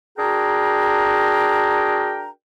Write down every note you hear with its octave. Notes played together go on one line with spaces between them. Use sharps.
D4 F#4 G#4 A#4 G5 A#5